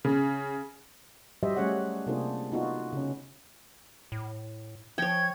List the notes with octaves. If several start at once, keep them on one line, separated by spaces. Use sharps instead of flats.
C#3
F#3 G3 G4 C5 D#5 E5
G3 A3 C#4 G#4 C#5 F#5
C3 A#3 D4 F4 G#4 C5
B3 D#4 F4 F#4
C#3 C#4
A2
F3 C#5 G5 G#6